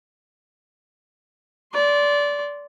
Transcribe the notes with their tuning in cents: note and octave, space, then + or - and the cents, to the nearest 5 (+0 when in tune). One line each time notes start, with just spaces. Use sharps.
D5 -20 C6 +0